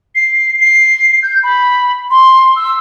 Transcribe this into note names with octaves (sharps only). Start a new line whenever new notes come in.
C7
C7
G6
B5
C6
E6